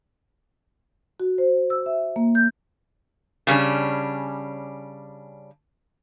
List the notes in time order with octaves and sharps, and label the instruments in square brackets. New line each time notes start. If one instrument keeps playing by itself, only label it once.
[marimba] F#4
C5
E6
E5
A#3
G6
[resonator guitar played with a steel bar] C#3 G3 C#4 D4